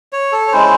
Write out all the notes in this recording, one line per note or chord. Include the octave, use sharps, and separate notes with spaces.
C#5
A4
C#5
G#3 C#4 E4 C5